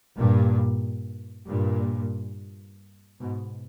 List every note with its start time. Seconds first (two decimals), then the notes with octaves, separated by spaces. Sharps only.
0.17 G2 A#2
1.47 G2 A#2
3.20 G#2 B2